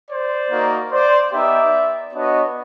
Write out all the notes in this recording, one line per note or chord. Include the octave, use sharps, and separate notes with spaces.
C5 D5
A#3 D#4 F#4
C5 D5
B3 D#4 G4 D5 E5
B3 D4 F#4 C#5 D#5